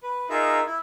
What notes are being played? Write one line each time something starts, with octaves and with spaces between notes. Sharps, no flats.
B4
D#4 F4 G#4 A#4 E5
E4